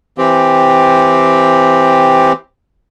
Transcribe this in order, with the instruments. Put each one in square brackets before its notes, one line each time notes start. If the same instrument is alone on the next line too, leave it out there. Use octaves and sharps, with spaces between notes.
[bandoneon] E3 C4 G4